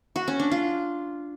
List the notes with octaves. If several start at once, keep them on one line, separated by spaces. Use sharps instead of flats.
F#4
C#4
D4
F4